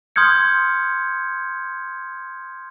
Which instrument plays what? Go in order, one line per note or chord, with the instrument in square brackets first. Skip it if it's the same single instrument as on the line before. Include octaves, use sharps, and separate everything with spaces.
[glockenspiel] C6 D#6 F6 G6 G#6 C#7